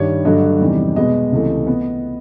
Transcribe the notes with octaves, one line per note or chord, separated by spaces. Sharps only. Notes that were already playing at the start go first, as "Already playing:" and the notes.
Already playing: G2 D#3 G3 C#5
G2 D3 F#3 A3 D#5
E2 C3 D#3 G3
B2 G#3 B3 D#5
C#2 C3 E3 A3
B3